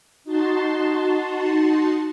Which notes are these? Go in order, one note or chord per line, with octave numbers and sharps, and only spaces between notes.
D#4 F#4 A5 C6